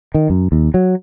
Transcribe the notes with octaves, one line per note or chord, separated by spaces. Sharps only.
D#3
F#2
D#2
F#3